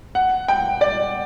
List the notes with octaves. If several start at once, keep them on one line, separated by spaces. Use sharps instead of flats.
F#5
G5
D5